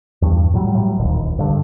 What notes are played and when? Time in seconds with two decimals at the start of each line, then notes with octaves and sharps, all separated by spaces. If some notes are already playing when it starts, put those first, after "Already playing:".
0.22 E2 G2
0.54 A2 F#3 G3
0.75 A2 F#3 G3
0.98 D1 A#1 D#2
1.39 G2 D3